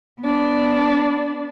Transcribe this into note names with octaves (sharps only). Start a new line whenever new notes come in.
B3 D4